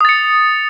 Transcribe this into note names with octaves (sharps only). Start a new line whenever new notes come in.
D#6 A6 C#7